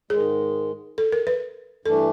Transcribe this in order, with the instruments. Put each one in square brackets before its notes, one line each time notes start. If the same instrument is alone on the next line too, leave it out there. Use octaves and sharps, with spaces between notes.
[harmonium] G#2 D#3 G#3 [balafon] G#4
[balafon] A4
A#4
B4
[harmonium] G2 E3 A3 D4 [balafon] A4